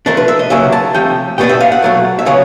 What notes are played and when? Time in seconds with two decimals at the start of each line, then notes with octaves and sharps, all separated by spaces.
0.06 F3 A3 D4 A#4
0.17 B4
0.28 E5
0.39 D#5
0.50 C#3 F#3 A#3 E5
0.72 A5
0.94 C3 F3 A3 G5
1.38 B2 G3 B3 D4 G5
1.49 E5
1.60 F5
1.72 F#5
1.82 B2 F#3 A3
2.19 E5
2.26 C#3 F#3 B3 F5